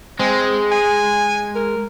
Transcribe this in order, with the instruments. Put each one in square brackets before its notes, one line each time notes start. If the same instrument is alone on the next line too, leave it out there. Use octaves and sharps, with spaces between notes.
[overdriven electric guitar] G#3 [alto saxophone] C4
[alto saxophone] G#5
A#4